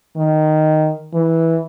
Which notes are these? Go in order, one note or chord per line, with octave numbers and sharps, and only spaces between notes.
D#3
E3